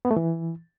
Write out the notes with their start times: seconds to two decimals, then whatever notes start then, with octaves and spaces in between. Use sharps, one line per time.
0.05 B3
0.11 A3
0.16 E3